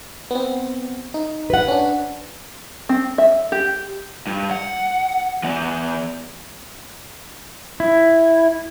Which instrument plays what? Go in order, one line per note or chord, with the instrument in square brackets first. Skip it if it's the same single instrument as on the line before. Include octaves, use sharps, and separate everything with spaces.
[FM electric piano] B3 C4
D#4
[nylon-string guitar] B4 F#5
[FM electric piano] C#4 D4
[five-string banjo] C4
E5
G4
[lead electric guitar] G2
F#5
E3 B3
[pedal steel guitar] E4